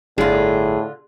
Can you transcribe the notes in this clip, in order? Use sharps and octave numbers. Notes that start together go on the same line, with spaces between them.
G1 A2 D3 F4 G#4